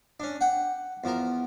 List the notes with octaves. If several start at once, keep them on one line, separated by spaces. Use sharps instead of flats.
C#4 D4
F#5 G5
E2 F3 A#4